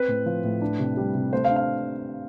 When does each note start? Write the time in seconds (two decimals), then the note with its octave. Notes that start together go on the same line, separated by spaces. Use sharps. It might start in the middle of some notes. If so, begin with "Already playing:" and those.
Already playing: C4 B4
0.08 A2
0.26 F3
0.44 A2
0.62 D4
0.79 C3
0.97 G3
1.15 C3
1.33 A3 C5
1.45 F5
1.50 D4
1.56 F5